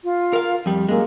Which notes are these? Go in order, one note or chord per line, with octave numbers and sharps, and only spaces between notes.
F4
A#4 F5
F2 G3
F#2 G#3 A#3